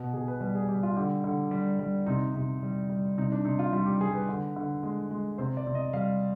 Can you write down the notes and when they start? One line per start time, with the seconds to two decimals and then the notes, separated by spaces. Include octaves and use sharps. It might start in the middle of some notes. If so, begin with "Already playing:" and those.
Already playing: B2
0.13 B2 G#4
0.28 B4
0.41 G3 B4
0.55 G#4
0.68 G3 G4
0.83 F4
0.96 D3 G4
1.24 D3
1.51 G3
1.79 G3
2.06 C3 D#4
2.35 C3
2.63 G3
2.89 G3
3.18 C3 D#4
3.32 D4
3.45 C3 D#4
3.59 F4
3.73 G3 F4
3.86 G4
4.00 G3 G#4
4.14 B4
4.29 D3
4.56 D3
4.83 G#3
5.11 G#3
5.38 C3 C5
5.57 D5
5.67 C3
5.75 D#5
5.93 G3 F5